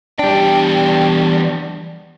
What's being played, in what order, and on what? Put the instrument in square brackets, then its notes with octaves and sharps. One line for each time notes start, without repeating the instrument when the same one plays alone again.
[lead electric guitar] E2 G5 [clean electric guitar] G3 D4